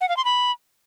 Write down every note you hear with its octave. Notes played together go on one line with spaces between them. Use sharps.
F#5
F5
C6
B5